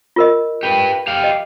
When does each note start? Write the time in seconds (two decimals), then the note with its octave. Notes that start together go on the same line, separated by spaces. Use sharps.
0.16 F4 A#4 D#5
0.63 G4 B4
1.07 G4 F5
1.24 D#5